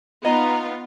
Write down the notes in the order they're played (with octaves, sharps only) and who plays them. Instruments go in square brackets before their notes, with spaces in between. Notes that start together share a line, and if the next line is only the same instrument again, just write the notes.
[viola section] B3 D#4 [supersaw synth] F4 [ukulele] D#5 [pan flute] A#5